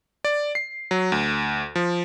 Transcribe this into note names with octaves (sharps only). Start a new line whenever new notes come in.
D5
C7
F#3
D2
F3